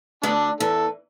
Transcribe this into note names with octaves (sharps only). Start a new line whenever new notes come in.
D2 D3 B3 D4
E2 E3 A4